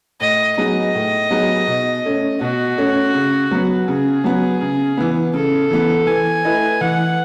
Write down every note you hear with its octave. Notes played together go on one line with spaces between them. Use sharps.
A2 D#5
F#3 B3 D#4 G#4 D#5
A2
F#3 B3 D#4 G#4
B2
A3 C#4
B2 F#4
A3 C#4
C#3
F#3 B3
C#3 G#4
F#3 B3
C#3
E3 B3
C#3 A4
E3 B3
E3 G#5
A3 E4 B4 D#5
E3 F#5